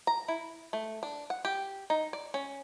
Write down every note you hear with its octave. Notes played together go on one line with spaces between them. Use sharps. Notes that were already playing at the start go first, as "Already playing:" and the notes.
A#5
E4
A3
D4
F#5
G4
D#4
D5
C#4